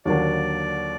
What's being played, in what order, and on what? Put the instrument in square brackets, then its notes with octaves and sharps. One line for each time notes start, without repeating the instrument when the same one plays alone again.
[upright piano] D#2 D3 F#3 A#3 D4 [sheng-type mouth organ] D5